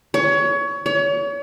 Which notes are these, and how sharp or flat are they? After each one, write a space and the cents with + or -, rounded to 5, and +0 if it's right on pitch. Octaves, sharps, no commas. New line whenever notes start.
C#5 +25
C#5 +35